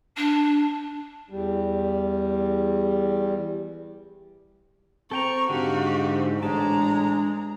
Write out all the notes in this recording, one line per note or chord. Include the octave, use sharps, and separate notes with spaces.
D4
E2 G3
C4 A4 G5 A#5 C#6
G#2 D3 F#4 G4 F5
A1 G#3 D4 A5 A#5